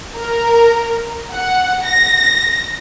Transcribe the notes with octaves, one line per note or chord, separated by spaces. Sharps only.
A#4
F#5
A#6